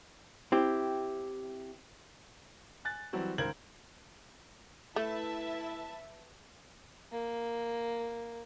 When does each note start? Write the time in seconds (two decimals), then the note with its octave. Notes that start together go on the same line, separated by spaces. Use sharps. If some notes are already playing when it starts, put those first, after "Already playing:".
0.52 C4 E4 G4
2.85 G#5 F#6 A6
3.13 E3 F#3 G3 C4 F#4
3.38 C#2 D#3 A#4 C5 G#6 F#7
4.96 A3 E4 B4 E5 A5
7.12 A#3